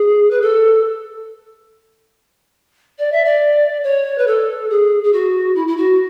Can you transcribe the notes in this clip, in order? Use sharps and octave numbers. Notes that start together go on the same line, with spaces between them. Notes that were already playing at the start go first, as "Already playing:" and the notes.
Already playing: G#4
B4
A4
D5
E5
D5
C#5
B4
A4
G#4
G#4
F#4
E4
E4
F#4